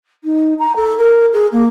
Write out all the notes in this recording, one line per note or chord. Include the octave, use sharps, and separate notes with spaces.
D#4
A#5
A4
A#4
G#4
A#3